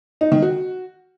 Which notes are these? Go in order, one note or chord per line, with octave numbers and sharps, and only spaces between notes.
D#4
D#3
F#4